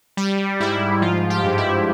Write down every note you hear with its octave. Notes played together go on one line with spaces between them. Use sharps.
G3
G#2 E4
F3 F4
G4
G2
E4